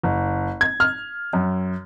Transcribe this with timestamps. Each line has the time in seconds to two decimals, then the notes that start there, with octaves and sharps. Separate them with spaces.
0.03 F#1
0.61 G#6
0.80 F6
1.33 F#2